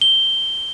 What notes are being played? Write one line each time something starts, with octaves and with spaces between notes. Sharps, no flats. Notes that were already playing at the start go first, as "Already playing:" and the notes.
G7